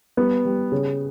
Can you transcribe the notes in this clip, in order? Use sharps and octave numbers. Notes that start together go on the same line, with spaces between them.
G3 B3
G3
C#3